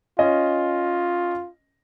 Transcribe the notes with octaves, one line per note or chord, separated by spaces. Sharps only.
C#4 F4 D#5